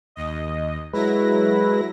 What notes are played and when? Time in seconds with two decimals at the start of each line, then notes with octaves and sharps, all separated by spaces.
0.16 D#2 D#5
0.93 F#3 G#3 E4 B4 A#6